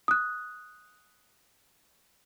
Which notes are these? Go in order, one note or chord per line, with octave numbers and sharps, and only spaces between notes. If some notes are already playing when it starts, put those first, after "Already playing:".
D#6 F#6